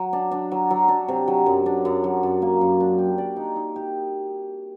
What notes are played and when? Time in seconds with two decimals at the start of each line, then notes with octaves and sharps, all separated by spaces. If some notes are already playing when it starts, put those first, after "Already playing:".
Already playing: F#3
0.13 D4
0.31 D4
0.51 F#3
0.70 F#3
0.88 D4
1.08 C3
1.28 F#3
1.46 F#2
1.66 D4
1.85 F#2
2.04 F#3
2.23 F#2
2.42 A#3
2.61 F#2
2.80 D4
2.99 G4
3.18 D5
3.36 D#4
3.56 D#4
3.76 G4